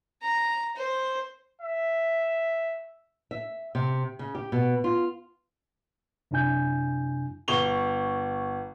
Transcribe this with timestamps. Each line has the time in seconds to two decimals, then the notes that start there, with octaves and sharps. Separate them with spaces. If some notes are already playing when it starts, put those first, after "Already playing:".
0.22 A#5
0.76 C5
1.62 E5
3.31 E5
3.75 C3
4.19 C#3
4.35 G4
4.52 B2
4.84 F4
6.31 F#2 C3 D4 E4 G#5 G6
7.48 G1 C#6 F7 G7